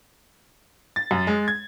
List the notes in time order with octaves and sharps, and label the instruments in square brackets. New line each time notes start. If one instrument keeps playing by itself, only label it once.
[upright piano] A6
F#2
G#3
G#6